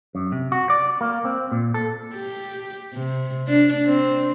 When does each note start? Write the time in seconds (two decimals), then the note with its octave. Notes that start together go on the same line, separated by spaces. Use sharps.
0.15 F#2
0.32 C3
0.52 F#4
0.70 D5
1.01 A#3
1.25 C4
1.52 A#2
1.74 A4
2.15 G4
2.93 C3
3.47 D4
3.86 C4